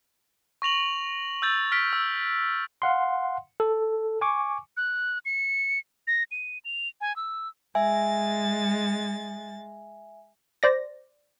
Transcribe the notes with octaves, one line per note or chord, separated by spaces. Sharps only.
C#6 A#6 F7 F#7
E6 G6 A6
F6 B6 D7
E6
F5 F#5 C6
A4
G#5 C#6 D6
F#6
C#7
A#6
D#7
F7
G#5
E6
G#3 E5 G#5 A6
C5 D5 A#6